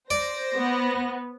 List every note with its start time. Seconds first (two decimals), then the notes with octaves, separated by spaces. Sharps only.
0.11 C5 D5 A#6
0.56 B3